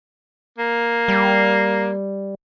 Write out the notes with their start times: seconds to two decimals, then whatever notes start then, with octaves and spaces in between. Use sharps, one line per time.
0.58 A#3
1.08 G3